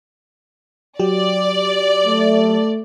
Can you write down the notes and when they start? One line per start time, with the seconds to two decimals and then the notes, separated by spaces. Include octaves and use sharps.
1.00 F#3 G4 D5
2.05 A3